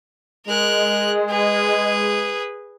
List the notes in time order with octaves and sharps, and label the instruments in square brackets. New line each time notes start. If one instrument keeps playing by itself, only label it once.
[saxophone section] G#3 [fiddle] A#4 F#6
[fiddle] G#4 B4